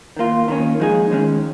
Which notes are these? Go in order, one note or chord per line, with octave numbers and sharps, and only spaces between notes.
D#3 A#3 F4
D#3 A#3 C#4
F3 G#3 D#4 G#4
D#3 G#3 C#4